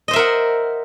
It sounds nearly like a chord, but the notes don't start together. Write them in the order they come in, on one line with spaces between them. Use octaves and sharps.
D#5 C5 E5 A#4 F#5